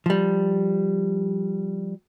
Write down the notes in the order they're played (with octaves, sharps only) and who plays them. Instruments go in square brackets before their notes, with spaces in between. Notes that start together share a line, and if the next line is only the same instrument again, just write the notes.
[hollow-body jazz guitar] F3 G3